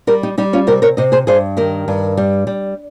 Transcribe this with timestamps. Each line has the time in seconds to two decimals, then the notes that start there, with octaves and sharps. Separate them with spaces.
0.07 G3 G4 A#4
0.23 D#4 G4
0.38 G3 D#4 G4
0.53 C#4 F4
0.67 C3 G4 A#4
0.82 A#4 C#5
0.97 C3 C5 D#5
1.12 G#4 C5
1.27 G2 G#4 C5
1.57 D#3 G4 A#4
1.88 G2
2.17 G3
2.47 G3